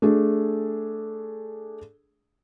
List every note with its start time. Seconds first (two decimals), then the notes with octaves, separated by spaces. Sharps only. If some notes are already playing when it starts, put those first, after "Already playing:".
0.02 A3 D4 G#4